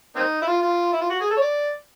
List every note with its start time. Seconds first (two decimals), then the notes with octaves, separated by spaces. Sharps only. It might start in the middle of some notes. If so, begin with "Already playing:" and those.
0.15 A#3 C4 D#4
0.42 E4
0.47 F4
0.62 F4
0.92 E4
1.01 F4
1.09 F#4
1.20 G#4
1.30 A4
1.36 C#5
1.41 D5